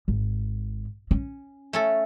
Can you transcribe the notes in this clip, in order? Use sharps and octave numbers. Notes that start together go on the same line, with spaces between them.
G#1
C#4
A3 C#4 A4